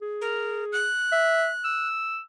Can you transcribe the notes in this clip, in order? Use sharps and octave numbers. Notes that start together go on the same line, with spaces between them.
G#4
A#4
F#6
E5
E6